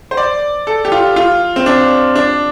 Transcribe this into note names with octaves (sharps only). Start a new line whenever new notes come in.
C5
D5
A4
G4
F4
F4
C4
D4
D4